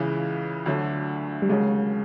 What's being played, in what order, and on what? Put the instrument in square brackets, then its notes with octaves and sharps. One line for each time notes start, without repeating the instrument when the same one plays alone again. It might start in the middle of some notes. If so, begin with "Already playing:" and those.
Already playing: [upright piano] C#2 C#3 E3
D2 D3 F#3 A3
[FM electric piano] G3
[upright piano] D#2 C#3 F#3 [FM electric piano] G#3